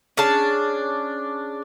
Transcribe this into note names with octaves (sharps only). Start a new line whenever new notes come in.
C#4 D4 G#4 A5